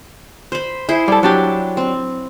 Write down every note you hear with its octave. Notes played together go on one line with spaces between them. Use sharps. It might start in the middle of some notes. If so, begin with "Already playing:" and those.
C5 B5
E4 G#4 C5
G3 A4
F#3 D4 G4
C4